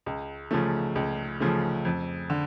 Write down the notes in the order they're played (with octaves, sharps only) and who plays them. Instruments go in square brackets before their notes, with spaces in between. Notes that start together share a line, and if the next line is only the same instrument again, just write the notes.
[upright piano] C#2
C#3 F3 A3
C#2
C#3 F3 A3
F2
D3